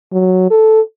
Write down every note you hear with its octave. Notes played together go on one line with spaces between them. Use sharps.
F#3
A4